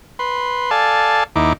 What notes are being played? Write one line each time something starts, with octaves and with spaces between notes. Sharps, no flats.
B4 C6
A4 D5 F5 G#5 A5
D#2 D#4 E4 D6